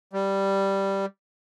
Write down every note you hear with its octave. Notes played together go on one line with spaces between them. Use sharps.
G3